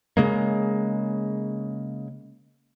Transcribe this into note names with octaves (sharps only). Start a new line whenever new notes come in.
C#3 G#3 A#3